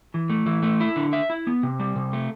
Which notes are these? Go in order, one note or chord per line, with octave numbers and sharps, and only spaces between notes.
E3
A3
E3
A3
E4
D3
E5
E4
B3
C3
G3
C3
A3